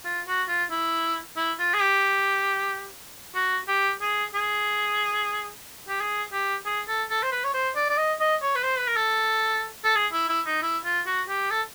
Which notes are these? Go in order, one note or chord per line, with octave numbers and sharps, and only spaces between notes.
F4
F#4
F4
E4
E4
F4
G#4
G4
F#4
G4
G#4
G#4
G4
G#4
G4
G#4
A4
A4
C5
B4
C#5
C5
D5
D5
D#5
D#5
C#5
B4
C5
B4
A#4
A4
A4
G#4
E4
E4
D#4
E4
F4
F#4
G4
A4